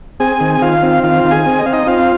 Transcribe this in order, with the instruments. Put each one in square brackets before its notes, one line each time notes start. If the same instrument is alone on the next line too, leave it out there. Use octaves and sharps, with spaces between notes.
[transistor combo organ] C4 G#4 G#5
D#3
G#5
D#3 F4 F5
C4
D#3 F4 F5
D#3
G#4 G#5
C4
D#5
C4 F5
D#4 D#5
C4 F4 F5